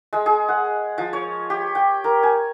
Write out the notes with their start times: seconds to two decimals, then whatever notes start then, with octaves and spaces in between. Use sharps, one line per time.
0.13 G#3
0.26 G#4
0.48 F#5
0.98 F3
1.13 C#5
1.50 G4
1.75 G5
2.04 A#4
2.23 G#5